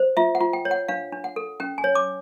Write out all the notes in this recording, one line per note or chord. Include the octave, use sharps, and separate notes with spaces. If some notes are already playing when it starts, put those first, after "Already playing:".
Already playing: C5
F4 E5
F#5
F4
G5
C#5
F#5
D4 F5
D4
F#5
A4
C#4 G5
G#5
C#5
D6